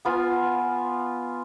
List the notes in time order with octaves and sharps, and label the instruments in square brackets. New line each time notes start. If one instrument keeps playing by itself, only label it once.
[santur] B3 F4 G#5